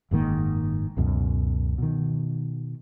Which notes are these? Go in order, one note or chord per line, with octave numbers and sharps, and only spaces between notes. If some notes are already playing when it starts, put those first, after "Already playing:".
F#1 G#2 D#3 A#3
C#2 F#2 B2
B2 D#3